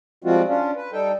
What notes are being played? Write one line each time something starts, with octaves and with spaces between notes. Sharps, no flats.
F3 G3 G#3 C4 F4 F#4
C#4 D4 F4
B4
G3 D#4 A4 G5